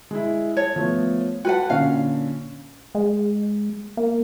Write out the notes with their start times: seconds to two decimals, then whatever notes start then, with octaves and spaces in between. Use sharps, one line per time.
0.11 G#3 E4
0.57 C#5 A5
0.76 F3 A3 B3
1.45 F#4 B4 F#5 G5 A5
1.70 A#2 D3 C#4 F5
2.95 G#3
3.97 A#3